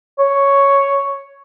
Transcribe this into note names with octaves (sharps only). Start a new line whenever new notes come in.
C#5